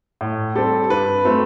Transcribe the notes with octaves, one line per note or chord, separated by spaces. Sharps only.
A2
G3 C4 A4
G2 B4
F#3 A3 C4